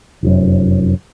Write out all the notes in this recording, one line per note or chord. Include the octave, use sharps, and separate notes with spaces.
F1 F#2